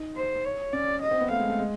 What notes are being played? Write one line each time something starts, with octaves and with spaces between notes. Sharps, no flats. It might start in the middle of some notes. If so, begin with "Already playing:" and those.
Already playing: D#4
C5
C#5
C#4 D5
D#5
C4
B3
A3 F5
G#3
A3
G#3